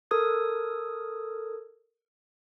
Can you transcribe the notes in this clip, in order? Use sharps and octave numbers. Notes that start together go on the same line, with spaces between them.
A4 A#4 D#6 G#6